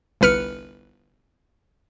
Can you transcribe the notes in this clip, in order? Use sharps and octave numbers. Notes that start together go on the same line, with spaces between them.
G1 C2 B4 F6 C#7